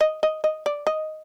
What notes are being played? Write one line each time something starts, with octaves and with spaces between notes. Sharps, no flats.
D#5
D#5
D#5
D5
D#5